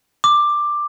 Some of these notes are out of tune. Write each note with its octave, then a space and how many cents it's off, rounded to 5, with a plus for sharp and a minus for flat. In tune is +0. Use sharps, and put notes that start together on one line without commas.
D6 +10